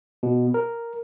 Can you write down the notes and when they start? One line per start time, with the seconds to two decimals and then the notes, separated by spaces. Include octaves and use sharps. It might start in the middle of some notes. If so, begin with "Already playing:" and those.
0.23 B2
0.54 A#4